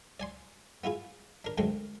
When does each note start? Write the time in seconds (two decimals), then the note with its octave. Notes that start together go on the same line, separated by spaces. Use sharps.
0.20 D5 G#5 C6
0.84 B3 E4 F4 G#4
1.45 D4 A#4
1.58 F#2 D3 G#3 A3 C4 D4